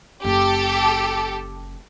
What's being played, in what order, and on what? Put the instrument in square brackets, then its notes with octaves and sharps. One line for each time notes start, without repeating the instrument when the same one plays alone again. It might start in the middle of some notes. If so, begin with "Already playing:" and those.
[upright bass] F#1 [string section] G4 A4